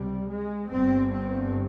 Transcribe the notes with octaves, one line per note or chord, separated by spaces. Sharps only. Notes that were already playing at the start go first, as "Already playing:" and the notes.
Already playing: C#2 C3 G3
G#3
G1 G2 C4
C4